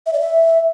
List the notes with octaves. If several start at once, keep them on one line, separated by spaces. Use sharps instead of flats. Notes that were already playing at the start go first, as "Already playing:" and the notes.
E5
D5
E5